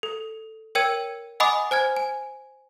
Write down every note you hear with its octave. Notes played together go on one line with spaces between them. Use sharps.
A4
A#4 C#5 G5 E6 G#6 D#7
D#5 F#5 G#5 B5 D6 D#6
C5 G#5 F6 G#6
G#5